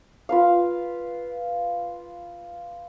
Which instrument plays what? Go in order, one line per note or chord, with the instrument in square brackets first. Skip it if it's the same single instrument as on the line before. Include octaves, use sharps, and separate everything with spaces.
[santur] F4 B4 F5